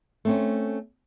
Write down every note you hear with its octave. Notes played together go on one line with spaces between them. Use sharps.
A3 C4 C#4